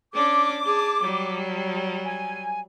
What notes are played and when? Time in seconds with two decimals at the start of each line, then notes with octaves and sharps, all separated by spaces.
0.14 C#4 D4 D6
0.66 G#4 A5
1.02 F#3 G3
2.05 G#5